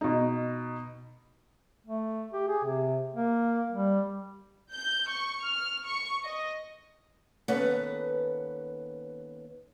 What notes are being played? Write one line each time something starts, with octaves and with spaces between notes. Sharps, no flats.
B2 D#4
A3
G4
G#4
C3
A#3
G3
G6
C#6
F6
C#6
D#5
D#2 B3 C#4 A4 B4 F#5